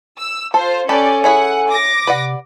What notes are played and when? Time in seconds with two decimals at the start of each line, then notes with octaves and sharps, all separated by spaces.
0.18 E6
0.54 F4 A4 C5
0.89 C#4 G4 A4 B4 D5 G#5 A5
1.24 C#4 E4 G#4 F#5
1.70 D6 A#6
2.07 C3 B4 D5 F#5